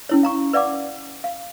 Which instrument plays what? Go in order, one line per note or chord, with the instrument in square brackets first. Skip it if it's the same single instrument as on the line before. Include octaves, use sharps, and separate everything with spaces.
[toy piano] C#4 E4 C#5
F5 A#5 C#6
B4 D5 F5 F#5 D6
F5